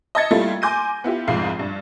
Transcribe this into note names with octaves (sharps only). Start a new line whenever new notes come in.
D#5 E5 A5 G#6 A6 C#7
G3 A3 A#3 E4 F4 A4
G#5 C6 D6 G6 A#6 D#7
B3 E4 F4 G4
C2 F2 G#2 F5 C7
G2